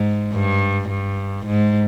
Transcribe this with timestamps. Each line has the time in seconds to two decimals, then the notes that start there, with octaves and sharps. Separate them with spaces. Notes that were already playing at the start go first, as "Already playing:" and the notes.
Already playing: G#2
0.33 G2
0.90 G2
1.47 G#2